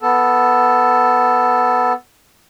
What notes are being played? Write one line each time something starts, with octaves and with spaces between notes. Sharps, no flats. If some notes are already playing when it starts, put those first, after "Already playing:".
B3 A4